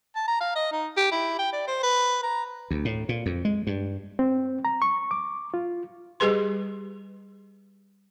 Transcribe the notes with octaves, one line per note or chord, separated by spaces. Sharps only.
A5
A#5
F5
D#5
D#4
G4
E4
G5
D5
C5
B4
A#5
D2
A2
A#2
F2
G#3
G2
C4
A#5
C#6
D6
F4
G3 G4 G#4 B4 C6